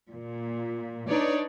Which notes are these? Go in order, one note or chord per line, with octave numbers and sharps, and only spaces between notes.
A#2
D4 D#4 B4 C#5 D5